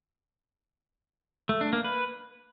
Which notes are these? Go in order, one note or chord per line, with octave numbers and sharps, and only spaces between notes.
A3
D4
A#3
B4